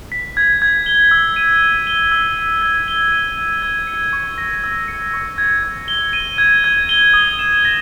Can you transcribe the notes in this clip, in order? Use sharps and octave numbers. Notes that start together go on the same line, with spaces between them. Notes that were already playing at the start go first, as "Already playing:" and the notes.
B6
G#6
G#6
G7
E6
D#7
G#6
G7
E6
G#6
G#6
G7
D#7
G#6
G#6
C#7
C#6
A#6
E6
C#7
C#6
G#6
G#6
G7
D#7
G#6
G#6
G7
D#6
E7
A#6